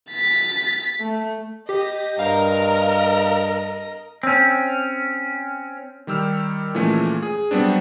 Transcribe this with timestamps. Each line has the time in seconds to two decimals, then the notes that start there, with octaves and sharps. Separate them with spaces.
0.11 A6 B6
1.01 A3
1.69 G4 D#5
2.19 G2 A#4 F5 A#5
4.23 C4 C#4
6.07 D#3 G3 G4 E6 F6
6.75 A#2 E3 F3 G#3 A3 C#4
7.22 G#4
7.51 F#3 G3 B3 C4 D4